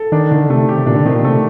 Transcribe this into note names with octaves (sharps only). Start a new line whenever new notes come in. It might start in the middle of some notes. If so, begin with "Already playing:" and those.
Already playing: A4
D#3 D4
D3 D#3
C3 A3
G4
A#2 D4
D3
C3 D#3
A#2
C3 A3